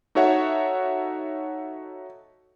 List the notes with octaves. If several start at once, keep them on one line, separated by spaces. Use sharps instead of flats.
D#4 F#4 A4 C#5 E5 F#5